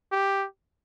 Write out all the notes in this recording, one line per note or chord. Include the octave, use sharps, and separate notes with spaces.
G4